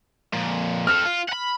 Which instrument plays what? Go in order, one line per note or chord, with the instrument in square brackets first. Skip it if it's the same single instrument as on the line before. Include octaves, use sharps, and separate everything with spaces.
[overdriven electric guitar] F2 A#2
[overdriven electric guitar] C4 A4 [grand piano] F6
[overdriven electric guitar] F4
F#5 B5